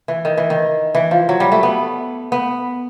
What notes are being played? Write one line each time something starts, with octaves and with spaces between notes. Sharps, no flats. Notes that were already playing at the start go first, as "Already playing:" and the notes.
E3
D#3
E3
D#3
E3
F3
F#3
G3
A3
B3
B3